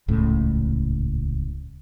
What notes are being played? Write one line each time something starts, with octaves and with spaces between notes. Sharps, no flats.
D#1 C#2 A2 C#3